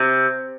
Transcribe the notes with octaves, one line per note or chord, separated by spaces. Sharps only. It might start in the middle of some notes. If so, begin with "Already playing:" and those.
Already playing: C3